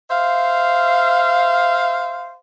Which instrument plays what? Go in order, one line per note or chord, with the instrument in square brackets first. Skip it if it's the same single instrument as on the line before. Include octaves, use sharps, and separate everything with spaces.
[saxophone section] C5 E5 F5